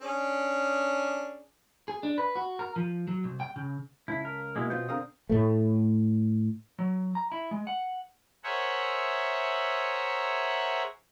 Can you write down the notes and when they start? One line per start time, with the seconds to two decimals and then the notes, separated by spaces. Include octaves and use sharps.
0.01 C#4 D4 G#4
1.88 G#4
2.03 D4
2.18 B4
2.36 F#4
2.59 A#4
2.76 F3
3.07 F#3
3.24 C2
3.40 G5
3.56 C#3
4.08 C#2 C#3 E4 A5 B6
4.25 A#4
4.56 B2 G#3 A#3 E4 G#4 D#6
4.70 B3 C4 F4 G6
4.89 D3 C4 A#4 F5 D#6
5.29 A2 A3
6.79 F#3
7.15 A#5
7.32 E4
7.51 G#3
7.67 F#5
8.44 G#4 A#4 C5 C#5 E5 F#5